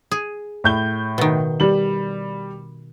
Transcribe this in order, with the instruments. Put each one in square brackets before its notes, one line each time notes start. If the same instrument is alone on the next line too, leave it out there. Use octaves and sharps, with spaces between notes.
[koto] G#4
[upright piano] A2 G6 G7
[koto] B2 D#3
[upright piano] G3 F#7